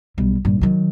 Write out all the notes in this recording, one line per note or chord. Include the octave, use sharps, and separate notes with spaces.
B1 G3
A#1 G2
D#3 F#3